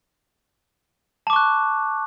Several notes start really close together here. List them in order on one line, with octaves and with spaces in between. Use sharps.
A5 D6 C#6 F#6